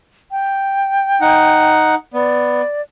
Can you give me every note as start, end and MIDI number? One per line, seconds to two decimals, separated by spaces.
0.31 1.72 79
1.21 1.95 63
1.21 1.95 78
2.14 2.61 59
2.14 2.82 74